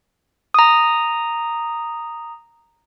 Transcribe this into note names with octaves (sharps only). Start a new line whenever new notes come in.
A#5 D#6